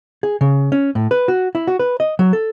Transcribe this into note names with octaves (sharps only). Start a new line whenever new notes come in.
G#4
C#3
C#4
A2
B4
F#4
E4
F#4
B4
D#5
F#3
A4